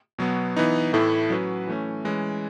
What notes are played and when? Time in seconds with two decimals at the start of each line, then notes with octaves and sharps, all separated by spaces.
0.18 B2 F#3 B3
0.56 E3 B3 D#4
0.93 A2 E3 A3 E4 A4
1.30 F#3 C#4 F#4 B4
1.67 E3 A3 C#4
2.05 E3 G#3 C#4